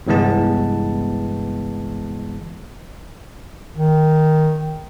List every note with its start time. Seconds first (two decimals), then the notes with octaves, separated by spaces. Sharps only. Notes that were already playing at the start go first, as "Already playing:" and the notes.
0.07 G1 C2 E3 G#3 B3 A5
3.77 D#3